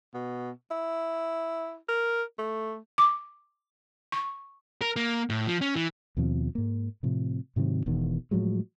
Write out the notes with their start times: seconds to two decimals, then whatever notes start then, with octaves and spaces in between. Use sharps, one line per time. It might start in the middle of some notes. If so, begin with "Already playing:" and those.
0.14 B2
0.71 E4
1.89 A#4
2.39 A3
2.98 D6
4.12 C#6
4.81 A#4
4.96 A#3
5.30 A2
5.47 F3
5.61 C#4
5.76 E3
6.17 D#2 B2 F3 C4
6.55 G#2 A#3
7.03 A2 C3 F3
7.56 G#2 C3 D#3 F#3
7.86 E1 E2 B2 D#3
8.31 A2 F3 F#3 G#3